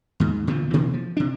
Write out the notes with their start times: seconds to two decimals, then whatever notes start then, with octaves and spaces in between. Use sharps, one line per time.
0.20 D#2 G#2
0.47 E2 A#2 D3 F3
0.73 B2 E3 F3 A#3
0.93 F3
1.17 C3 D4